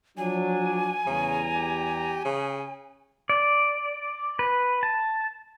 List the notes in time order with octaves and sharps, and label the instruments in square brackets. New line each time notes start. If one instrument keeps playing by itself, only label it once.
[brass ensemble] F3 F#3 D4 [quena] G#5
[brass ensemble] E2 G3 A#5 [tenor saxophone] C#3
[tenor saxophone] G4
C#3
[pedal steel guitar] D5
B4
A5